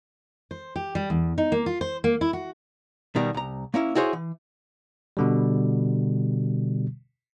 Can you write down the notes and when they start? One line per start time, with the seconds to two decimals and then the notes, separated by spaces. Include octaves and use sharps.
0.51 C5
0.76 G4
0.95 G3
1.10 E2
1.38 D#4
1.52 A#3
1.66 F4
1.81 C5
2.04 A#3
2.21 E4
2.33 F#4
3.16 B2 D#3 G3
3.34 C2 A#5
3.74 A#3 C#4 E4
3.95 E4 F#4 G#4 C5 C#5
4.13 E3
5.17 B2 D3 G3